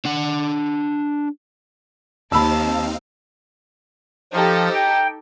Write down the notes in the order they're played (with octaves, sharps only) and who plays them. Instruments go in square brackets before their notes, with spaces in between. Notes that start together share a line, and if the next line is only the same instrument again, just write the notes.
[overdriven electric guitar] D4 F#5
[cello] D#2 [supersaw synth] C4 D#4 F5 [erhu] A5 [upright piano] B5 E6
[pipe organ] F3 [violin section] D#4 G4 A4
[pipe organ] G5